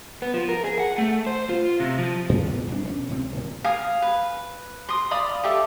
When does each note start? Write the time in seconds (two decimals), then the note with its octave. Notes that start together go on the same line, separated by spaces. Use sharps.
0.22 B3
0.34 F3
0.49 A#4
0.64 G#4
0.80 F#5
0.98 A3
1.26 C5
1.49 F4
1.80 C3
1.98 F3
2.29 F#2 A#2
2.46 B2 E3 F3 G#3
2.68 D#1 C2 D4
2.85 E1 C#4
3.09 C#2 C3 A#3 C4
3.32 D#1 G#1 D#2 A#2
3.64 F5 G#5 D#6
4.02 B4
4.89 C6 D#6
5.11 D5 F5 B5 D#6
5.44 G4 A4 E5